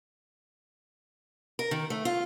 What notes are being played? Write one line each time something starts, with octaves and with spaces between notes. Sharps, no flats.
A#4
D#3
A3
F4